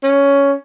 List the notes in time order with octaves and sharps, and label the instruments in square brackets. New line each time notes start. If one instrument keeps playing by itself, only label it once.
[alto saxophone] C#4